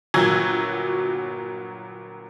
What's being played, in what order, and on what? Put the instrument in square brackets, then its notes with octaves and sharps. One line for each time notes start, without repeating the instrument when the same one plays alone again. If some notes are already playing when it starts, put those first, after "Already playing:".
[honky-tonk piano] G1 A#2 F#3 F#4 E6 G#6